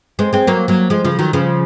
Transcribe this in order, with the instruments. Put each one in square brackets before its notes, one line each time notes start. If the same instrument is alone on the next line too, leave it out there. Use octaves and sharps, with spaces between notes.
[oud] G#3 C4
G#3 C4
F#3 A#3
F#3 A#3
F3 G#3
C#3 F3
D#3 F#3
C#3 F3